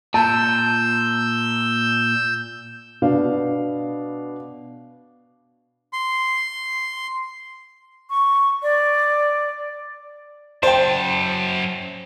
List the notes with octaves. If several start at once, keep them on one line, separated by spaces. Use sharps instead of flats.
A#2 A5 E6 G6
B2 B3 D4 F5
C6
C#6
D5
F#2 C5 G5 A5